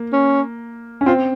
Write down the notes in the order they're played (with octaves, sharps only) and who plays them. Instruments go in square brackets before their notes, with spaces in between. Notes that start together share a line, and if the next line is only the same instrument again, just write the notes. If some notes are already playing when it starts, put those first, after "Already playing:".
Already playing: [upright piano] A#3
[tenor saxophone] C#4
[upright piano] C#4
[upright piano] C4 [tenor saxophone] F4